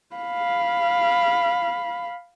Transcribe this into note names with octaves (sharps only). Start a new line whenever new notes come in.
F5 B5